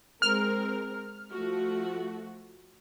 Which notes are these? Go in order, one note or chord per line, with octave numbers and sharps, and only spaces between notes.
G#3 C4 A#4 F6
F3 A3 F#4